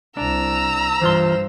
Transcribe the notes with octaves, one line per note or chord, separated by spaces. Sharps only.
C2 D4 A#5 E6
G2 E3 F4 C5 C6